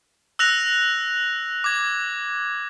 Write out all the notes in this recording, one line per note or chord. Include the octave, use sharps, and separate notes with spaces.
E6 F#6 A#6 F7
D6 G#6